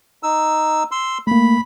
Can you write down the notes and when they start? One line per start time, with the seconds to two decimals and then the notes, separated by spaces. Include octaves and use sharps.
0.23 D#4 E6
0.91 C6 E6
1.27 A3 A#3 B5